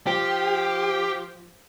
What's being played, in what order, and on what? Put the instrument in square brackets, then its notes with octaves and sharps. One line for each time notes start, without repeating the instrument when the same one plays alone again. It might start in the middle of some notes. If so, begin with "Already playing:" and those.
[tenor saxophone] F3 [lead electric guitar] G4